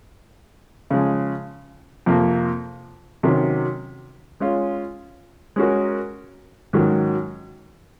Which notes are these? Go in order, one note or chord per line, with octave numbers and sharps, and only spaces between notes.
C#3 F3 G#3
F2 C3 F3 A#3
C3 D#3 F#3 C#4
G#3 C#4 F4
G#3 C#4 F#4 A#4
G#2 D#3 F#3 C#4